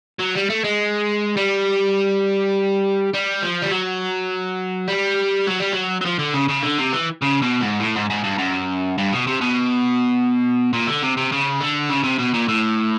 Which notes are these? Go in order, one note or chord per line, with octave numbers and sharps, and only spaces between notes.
F#3
G3
A3
G#3
G3
G3
F3
G3
F#3
G3
F#3
G3
F#3
F#3
F3
D3
C#3
C#3
D3
C3
E3
C#3
B2
G#2
A2
G#2
G#2
G2
F#2
G2
B2
C3
B2
A#2
D3
C3
C3
C#3
D3
C#3
C3
B2
A#2
A2